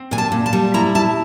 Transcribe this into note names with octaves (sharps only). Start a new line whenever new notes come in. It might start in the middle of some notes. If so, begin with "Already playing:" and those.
Already playing: C4
A#2 G#5
A5
A#2
A5
G3
E4 A#5
E4 A5